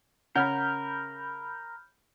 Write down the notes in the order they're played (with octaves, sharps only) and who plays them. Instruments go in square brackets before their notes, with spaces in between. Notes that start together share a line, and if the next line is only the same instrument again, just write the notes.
[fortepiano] C#3 [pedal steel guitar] A#4 [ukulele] C#5 F#5 [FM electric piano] B5 F6 G6